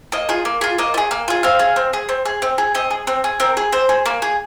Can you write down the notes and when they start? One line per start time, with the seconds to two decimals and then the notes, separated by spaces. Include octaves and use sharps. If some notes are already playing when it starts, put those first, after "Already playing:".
0.12 A#3 D#5
0.29 F4 G#4
0.45 A#3
0.61 F4 G#4
0.78 A#3 D#5
0.94 F4
0.98 G#4
1.11 A#3
1.28 F4 G#4
1.43 C4 F5
1.59 G#4
1.76 C4
1.93 G#4
2.09 C4
2.25 G#4
2.42 C4
2.58 G#4
2.75 C4 D#5
2.91 G#4
3.07 C4
3.24 G#4
3.40 C4 A#4
3.57 G#4
3.72 C4 C5
3.89 G#4
4.06 A#3
4.22 G#4